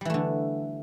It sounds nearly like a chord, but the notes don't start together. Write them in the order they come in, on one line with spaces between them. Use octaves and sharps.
G3 E3 A3 D3